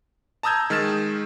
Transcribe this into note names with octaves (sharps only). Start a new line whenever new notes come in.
A5 A#5 D#6 E6 G6 G#6
D#3 G#3 F6 A6 E7